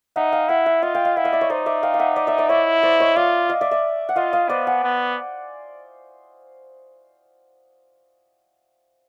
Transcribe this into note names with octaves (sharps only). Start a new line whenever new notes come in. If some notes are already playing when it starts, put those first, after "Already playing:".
D#4 E5 F#5
F5 G5
E4 E5 F#5
E5 F#5
F4 D#5 F5
F5 G5
D#5 F5
E4 E5 F#5
D#5 F5
D5 E5
C#5 D#5
D#4 C5 D5
D5 E5
F5 G5
F5
E5 F#5
D5 E5
D5 E5
D5 E5
E4 C#5 D#5
C5 D5
C#5 D#5
F4 D5 E5
D#5 F5
D5 E5
D5 E5
F#5
F4 D#5 F5
D#5 F5
B3 C5 D5
F#5 G#5
B3